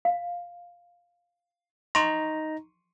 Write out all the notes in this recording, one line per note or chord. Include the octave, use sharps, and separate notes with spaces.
F5
D#4 A#5 C6 C#6